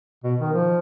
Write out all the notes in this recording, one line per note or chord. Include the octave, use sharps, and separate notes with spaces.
B2
D#3
F3